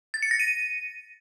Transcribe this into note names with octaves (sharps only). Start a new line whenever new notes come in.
A6
C#7
A#6
D#7